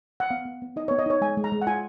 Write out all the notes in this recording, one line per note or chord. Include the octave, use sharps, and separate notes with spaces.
F#5
B3 F5
B3
B3
D#4 D#5
B3 C#5
D#5
D#4 C#5
G#3 G#5
G#3
A#5
G#3
F#5
F4 G#5